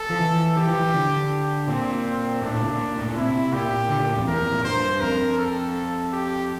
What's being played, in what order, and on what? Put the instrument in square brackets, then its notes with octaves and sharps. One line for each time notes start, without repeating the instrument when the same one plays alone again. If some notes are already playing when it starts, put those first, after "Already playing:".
Already playing: [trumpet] A4
[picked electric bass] F3
E3
[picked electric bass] E3 [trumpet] G4
[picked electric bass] F3
E3
D3
[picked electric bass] A#2 [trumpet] C4
[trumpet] C4
[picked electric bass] A2 [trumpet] D4
[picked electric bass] A2
C3
A#2
A2
A#2
[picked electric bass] C3 [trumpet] E4
[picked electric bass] A#2 [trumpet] G4
[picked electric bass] A#2
D3
A#2
A2
F2
[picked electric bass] E2 [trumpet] A#4
[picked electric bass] F2
A#2
[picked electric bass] G2 [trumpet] C5
[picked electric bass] F2 [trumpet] A#4
[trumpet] A4
G4